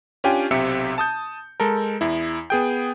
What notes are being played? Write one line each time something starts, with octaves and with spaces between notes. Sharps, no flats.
C#4 D4 F4 G4 G5 G#5
B1 C3 C4 G4 E5 C#7
A5 D#6 G6
G#3 A4 A#4
E2 E4
B3 G#4 G5